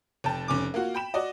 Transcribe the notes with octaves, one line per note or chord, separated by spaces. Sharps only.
F1 G5 A5
F1 C#4 D6
A#3 F4 F#4
G5 B5 E7
F#4 D5 D#5